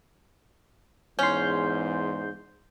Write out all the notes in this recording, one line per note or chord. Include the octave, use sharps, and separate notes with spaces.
E2 G#2 C#4 C6 G6